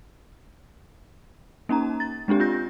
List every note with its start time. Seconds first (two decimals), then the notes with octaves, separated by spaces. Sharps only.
1.69 A#3 C#4 D#4 A#5
2.00 A6
2.28 G#3 C4 D4 G4
2.40 F4 G6 A#6